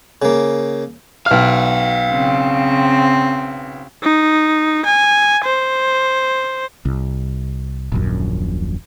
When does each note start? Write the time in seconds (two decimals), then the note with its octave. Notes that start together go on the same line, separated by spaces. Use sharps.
0.22 C#3 A#3
1.26 B1 F5 G5 F6
2.11 C#3 C4
4.03 D#4
4.86 G#5
5.44 C5
6.85 C2
7.92 D#1 A#1 F#2